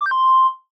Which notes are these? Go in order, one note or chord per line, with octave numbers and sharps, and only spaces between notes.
D6
G6
C6